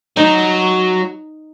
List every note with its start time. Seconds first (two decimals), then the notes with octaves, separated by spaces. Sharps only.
0.17 F#3 D#4